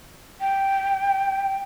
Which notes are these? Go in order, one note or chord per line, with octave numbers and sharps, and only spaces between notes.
G5